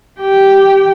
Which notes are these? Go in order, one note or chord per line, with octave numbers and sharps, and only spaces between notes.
G4 G5